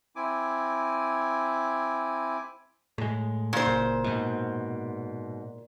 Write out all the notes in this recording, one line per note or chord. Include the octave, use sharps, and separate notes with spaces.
C4 E4 G#5 D6
A2 G#3
A#2 C5
F#1
G#2 B2